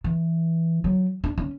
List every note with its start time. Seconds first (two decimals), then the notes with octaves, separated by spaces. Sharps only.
0.04 E3
0.84 F#3
1.24 D4
1.38 C#4